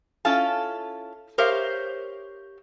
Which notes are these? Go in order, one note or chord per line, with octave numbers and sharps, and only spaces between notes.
C#4 E4 F4 A4 F5 A5
G4 A#4 C5 C#5 E5 F5